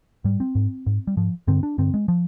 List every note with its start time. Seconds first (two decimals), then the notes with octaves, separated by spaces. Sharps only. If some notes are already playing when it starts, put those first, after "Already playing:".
0.24 G#2 G3
0.40 C4
0.55 G#2
0.86 G#2
1.07 G3
1.17 G#2 F3
1.48 G2 D3 C4
1.63 D4
1.78 G2 D3 C4
1.94 G#3
2.08 F3